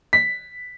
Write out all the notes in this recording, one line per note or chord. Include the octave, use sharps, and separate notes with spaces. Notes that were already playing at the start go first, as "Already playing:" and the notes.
B6